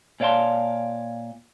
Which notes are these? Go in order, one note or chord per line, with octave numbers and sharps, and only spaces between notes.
A#2 C#5 D5 F5 A5 C6